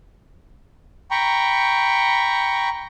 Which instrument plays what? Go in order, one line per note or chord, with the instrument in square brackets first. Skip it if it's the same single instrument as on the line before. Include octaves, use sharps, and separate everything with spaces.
[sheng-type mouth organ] G5 A#5 B5 C#6